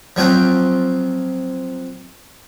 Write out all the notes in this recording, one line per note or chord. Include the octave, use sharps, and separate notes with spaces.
F3 F#3 C4 G5